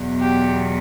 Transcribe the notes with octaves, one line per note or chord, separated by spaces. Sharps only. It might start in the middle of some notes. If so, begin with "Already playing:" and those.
Already playing: E2 B2 F#3
G4